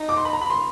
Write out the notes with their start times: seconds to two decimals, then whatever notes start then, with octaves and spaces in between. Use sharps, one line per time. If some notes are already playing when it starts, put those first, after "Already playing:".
Already playing: D#4
0.09 D6
0.17 C6
0.25 B5
0.33 A#5
0.41 B5
0.50 C6